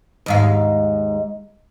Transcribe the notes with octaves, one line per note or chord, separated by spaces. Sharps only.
D#2 G#2 F5